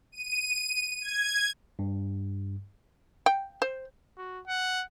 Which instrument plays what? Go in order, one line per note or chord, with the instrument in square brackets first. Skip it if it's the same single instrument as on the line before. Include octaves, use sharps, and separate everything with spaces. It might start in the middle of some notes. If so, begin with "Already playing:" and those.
[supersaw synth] D#7
G#6
[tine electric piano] G2
[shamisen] G5
C5
[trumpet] F#4
F#5